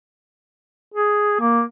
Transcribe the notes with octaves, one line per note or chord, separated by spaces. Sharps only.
G#4
A#3